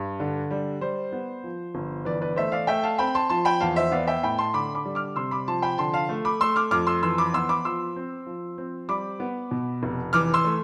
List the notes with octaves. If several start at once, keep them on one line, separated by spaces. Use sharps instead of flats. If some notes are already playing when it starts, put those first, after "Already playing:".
Already playing: G2
D3
G3
G3 C5
B3
F3
G1
E3 B4 D5
B4 D5
A3 C5 E5
D5 F5
A3 E5 G5
F5 A5
C4 G5 B5
A5 C6
F3 A5 C6
G5 B5
E2 F5 A5
C5 E5
B3 D5 F5
E5 G5
A2 G5 B5
A5 C6
D3 B5 D6
B5 D6
G3
D6 F6
C3 C6 E6
B5 D6
F3 A5 C6
G5 B5
D3 A5 C6
F5 A5
A3
B5 D6
A3 C6 E6
D6 F6
F2 D6 F6
C6 E6
E3 C6 E6
B5 D6
B3 C6 E6
B5 D6
F3 C6 E6
C4
F3
C4
G3 B5 D6
B3
B2
F1
E3 D6 F6
C6 E6
A3